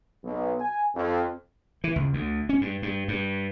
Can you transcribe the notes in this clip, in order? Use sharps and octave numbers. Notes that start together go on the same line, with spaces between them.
B1
G#5
F2
E3
C#2
D2
C#4
G2
G2
G2